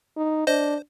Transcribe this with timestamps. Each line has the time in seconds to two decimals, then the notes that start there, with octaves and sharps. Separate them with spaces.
0.17 D#4
0.47 D4 C5 D#5